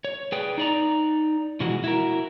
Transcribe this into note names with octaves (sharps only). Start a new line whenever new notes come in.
C#5
G#4 B4 D5 G5
D#4 D5 A#5
B2 E3 F3 G#3 F#4
E4 F#4 A#4